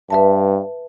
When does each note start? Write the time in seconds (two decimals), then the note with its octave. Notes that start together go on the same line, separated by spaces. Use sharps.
0.10 G2 B4 E5 A5